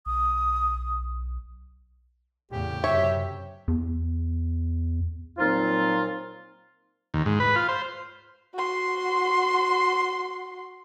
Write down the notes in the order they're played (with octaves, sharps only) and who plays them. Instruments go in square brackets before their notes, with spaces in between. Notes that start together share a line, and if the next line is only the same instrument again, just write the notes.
[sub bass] B1 [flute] D#6
[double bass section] E2 A2 C#3 [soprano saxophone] G4
[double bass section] F#2 C3 [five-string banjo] C#5 [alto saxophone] E5
[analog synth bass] E2
[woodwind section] A#2 F3 F#3 C4 D#4 F4
[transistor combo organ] D#2
G#2
B4
F4
C5
[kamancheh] F#4 C6